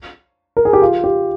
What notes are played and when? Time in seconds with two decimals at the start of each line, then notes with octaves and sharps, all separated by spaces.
0.57 A#4
0.65 G#4
0.73 G4
0.82 F4
1.04 G4